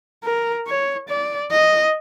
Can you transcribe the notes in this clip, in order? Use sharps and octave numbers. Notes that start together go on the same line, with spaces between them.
A#4
C#5
D5
D#5